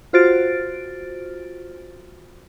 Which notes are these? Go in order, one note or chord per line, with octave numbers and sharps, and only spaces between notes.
F4 F#4 C5 F6 A6 D7